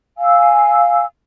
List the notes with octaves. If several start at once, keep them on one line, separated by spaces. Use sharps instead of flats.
F5 G#5 E6